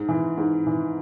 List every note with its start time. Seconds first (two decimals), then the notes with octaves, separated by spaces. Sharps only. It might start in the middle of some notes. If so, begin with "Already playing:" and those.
Already playing: G#2
0.09 E3
0.37 G#2
0.67 E3